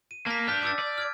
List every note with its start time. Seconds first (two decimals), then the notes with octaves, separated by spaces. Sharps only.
0.11 D#7
0.26 A#3 A5 B6
0.47 D4 G4 F6 G6 B6
0.63 D6 E6 A6
0.79 D5
0.98 F6 G#6 D7